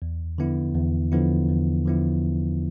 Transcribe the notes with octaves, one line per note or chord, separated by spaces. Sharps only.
E2
D3 F3 B3 E4
E2
D3 F3 B3 E4
E2
D3 F3 B3 E4
E2